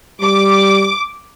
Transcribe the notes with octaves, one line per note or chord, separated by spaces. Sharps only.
G3 D6